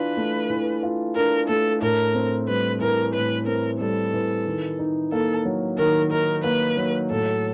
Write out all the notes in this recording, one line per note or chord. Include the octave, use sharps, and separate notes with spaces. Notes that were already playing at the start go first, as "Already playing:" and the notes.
Already playing: E3 D4 F4 B4
A3
E3
F4
D4 A#4
A3 A4
A2 A#4
C4
G3 B4
E3 A#4
A2 B4
C4 A#4
G3 A4
E3
D#3
D#4
A#3 A4
F#3
D#3 A#4
D#4 A#4
A#3 B4
F#3
A2 A4